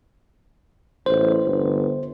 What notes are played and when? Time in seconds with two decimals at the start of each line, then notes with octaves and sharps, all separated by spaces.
1.06 A1 C5
1.46 G1